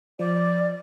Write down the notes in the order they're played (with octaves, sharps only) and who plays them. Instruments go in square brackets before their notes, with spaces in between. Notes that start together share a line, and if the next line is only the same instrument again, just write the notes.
[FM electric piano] F3 [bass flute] D5